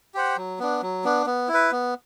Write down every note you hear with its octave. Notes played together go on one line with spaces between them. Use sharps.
G4 C5 F#5
F#3
B3 D4
F#3
B3 D4
B3
E4
B4
B3